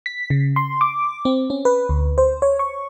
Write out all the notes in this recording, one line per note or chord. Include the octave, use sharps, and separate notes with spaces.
B6
C#3
C6
D6
C4
C#4
B4
D2
C5
C#5
C#6